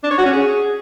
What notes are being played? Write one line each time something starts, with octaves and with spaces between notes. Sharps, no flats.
D4
C#5
F#4
C#4
G#4